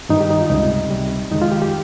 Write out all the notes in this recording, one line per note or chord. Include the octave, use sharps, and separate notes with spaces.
G2 D#3 G3 D#4
G4
D#4
F4
C#2 C3 G3 D#4
C#2 C3 G3
F2 D#3 G#3 D#4
F4
G4
G4